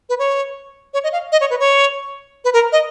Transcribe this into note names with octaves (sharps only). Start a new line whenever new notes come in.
B4
C#5
C#5
D#5
F5
D#5
C#5
B4
C#5
B4
A#4
D#5